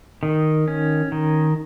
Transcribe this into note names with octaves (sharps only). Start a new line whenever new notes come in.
D#3
C#4
D#3